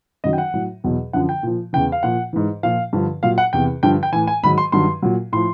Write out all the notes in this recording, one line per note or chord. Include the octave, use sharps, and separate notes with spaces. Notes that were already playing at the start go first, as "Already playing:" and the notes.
F#2 D#3 F#3 D#5
G5
F#5
A2 F#3
E2 B2 F#3
F#2 D3 F3 F#5
G5
A#2 F3
E2 C#3 E3 G5
F5
A#2 F3 F#5
G#2 E3
A#2 F3 F5
G2 D3 F3
A#2 F#3 F5
F#5
E2 C3 E3 G5
G2 D3 F3 G5
G5
A2 E3 G#5
G#5
G#2 D#3 F#3 B5
C6
G2 D#3 F#3 C6
A#2 F#3
A2 F3 C6